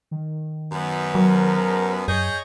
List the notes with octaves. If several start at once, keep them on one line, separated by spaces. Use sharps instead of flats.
D#3
F#2 B3
F#3 A#4
F#2 G#4 C#5 D#5 G6